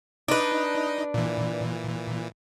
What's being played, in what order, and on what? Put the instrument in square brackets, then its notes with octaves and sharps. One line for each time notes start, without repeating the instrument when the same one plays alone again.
[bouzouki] D4 B4 [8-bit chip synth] D#4 D#5
[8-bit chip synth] A#2 E3